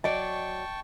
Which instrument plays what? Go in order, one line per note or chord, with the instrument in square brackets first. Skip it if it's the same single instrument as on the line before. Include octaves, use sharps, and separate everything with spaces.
[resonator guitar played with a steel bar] F#3 D5 [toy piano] D#5 [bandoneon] G5 A5 C#6